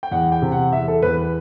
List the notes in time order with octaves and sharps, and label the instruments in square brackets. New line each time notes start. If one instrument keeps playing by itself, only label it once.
[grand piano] G5
E2 F#5
G5
C3
F#5
E2 E5
A4
E2 B4